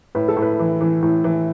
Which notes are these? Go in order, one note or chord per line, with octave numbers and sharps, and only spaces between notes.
A2 B4
A4
A2
B4
E3
E3
A2
E3